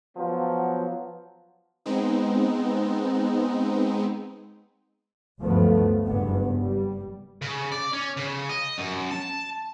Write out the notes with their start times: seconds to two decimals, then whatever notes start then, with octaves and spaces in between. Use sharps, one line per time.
0.16 F3 F#3 B3
1.86 G#3 B3 C4 D#4
5.41 D2 G2 F3 F#3 A3 B3
6.05 F#1 G2 B3
6.61 G3
7.42 C#3
7.72 D5
7.93 C#4
8.17 C#3
8.49 D#5
8.78 F#2
9.11 A5